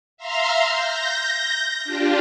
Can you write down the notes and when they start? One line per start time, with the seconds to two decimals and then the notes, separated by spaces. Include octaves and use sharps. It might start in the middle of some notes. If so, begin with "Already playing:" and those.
0.17 E5 F5 A#5 C6 F6
0.68 G6 A#6
1.84 D4 F4 G4